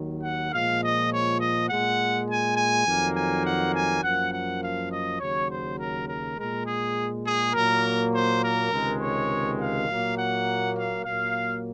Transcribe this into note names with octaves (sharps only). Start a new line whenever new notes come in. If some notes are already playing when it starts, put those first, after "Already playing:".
Already playing: D#2 D#3 F#3
F#5
A#2 F3 G#3 F5
D#5
C#5
D#5
A#2 G#3 F#5
G#5
G#5
F2 D#3 F#3 A#3
G#5
F#5
G#5
F#2 F3 A#3 F#5
F#5
F5
D#5
D#2 C#3 F#3 C#5
C5
A#4
A#4
A#2 G#3 A#4
G#4
G#4
A#2 F#3 A#3 A#4
C5
A#4
C#2 C3 D#3 G#3
C#5
F5
A#2 F#3 A#3
F#5
F5
A#2 F#3 A#3 F5